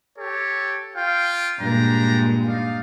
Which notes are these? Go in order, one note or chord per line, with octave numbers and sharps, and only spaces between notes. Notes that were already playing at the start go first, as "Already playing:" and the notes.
G4 A4 C#5
F4 F5 G5
G2 A#2 G#3 D4 G5 A#5
D#4 D5 F5